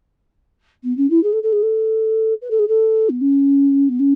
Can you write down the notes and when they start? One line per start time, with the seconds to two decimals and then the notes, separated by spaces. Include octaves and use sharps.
0.83 B3
0.97 C#4
1.10 E4
1.23 G#4
1.32 A4
1.43 A4
1.52 G#4
1.62 A4
2.41 B4
2.50 A4
2.59 G#4
2.68 A4
3.09 B3
3.21 C#4
3.89 B3
3.99 C#4